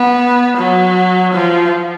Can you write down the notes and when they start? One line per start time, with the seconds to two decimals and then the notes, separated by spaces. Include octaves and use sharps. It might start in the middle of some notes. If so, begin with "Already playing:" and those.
Already playing: B3
0.57 F#3
1.34 F3